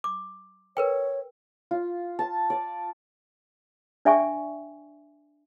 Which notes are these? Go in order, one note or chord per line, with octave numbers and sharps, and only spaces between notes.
D6
A#4 B4 C#5 G5
F4
A5
D5
D4 D5 E5 G5 G#5 C#6